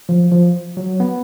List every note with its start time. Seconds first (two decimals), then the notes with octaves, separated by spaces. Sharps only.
0.09 F3
0.31 F3
0.77 F#3
1.00 B3